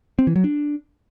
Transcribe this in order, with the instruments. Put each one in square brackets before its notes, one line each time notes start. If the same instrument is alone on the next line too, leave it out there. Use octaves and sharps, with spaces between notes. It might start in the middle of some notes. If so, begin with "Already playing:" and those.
[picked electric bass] C4
E3
F#3
D4